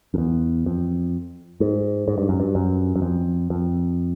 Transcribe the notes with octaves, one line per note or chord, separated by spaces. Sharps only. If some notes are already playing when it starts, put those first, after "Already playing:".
F2
E2
F2
G#2
G#2
G2
F#2
G2
F#2
F#2
F2
F2